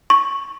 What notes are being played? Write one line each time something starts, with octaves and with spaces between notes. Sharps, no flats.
C#6